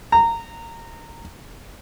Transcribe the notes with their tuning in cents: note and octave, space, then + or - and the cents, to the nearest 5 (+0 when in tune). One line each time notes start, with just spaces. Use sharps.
A#5 -20